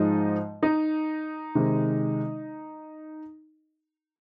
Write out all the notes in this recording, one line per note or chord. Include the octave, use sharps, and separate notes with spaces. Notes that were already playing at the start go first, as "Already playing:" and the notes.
Already playing: G#2 F3 G#3 D#4 D#5
D#4 D#5
C3 D#3 G#3